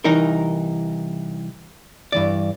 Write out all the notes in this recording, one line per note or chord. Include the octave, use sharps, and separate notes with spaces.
C2 E3 D#4 A#4
G2 E3 D5